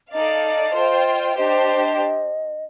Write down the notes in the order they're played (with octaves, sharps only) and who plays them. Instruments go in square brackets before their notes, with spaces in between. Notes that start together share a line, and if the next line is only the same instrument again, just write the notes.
[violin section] D#4 A4 D5 F5 [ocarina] D#5
[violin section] F4 C5 G5
[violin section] D4 G4 C5 [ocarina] D#5